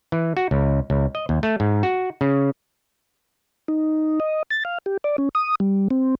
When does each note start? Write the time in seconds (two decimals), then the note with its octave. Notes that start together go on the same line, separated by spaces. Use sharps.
0.12 E3
0.37 F#4
0.51 C#2
0.90 C#2
1.15 D#5
1.29 D#2
1.43 A3
1.60 G#2
1.83 F#4
2.21 C#3
3.68 D#4
4.20 D#5
4.51 A6
4.65 F5
4.86 G4
5.04 D5
5.18 C#4
5.35 D#6
5.60 G3
5.91 C4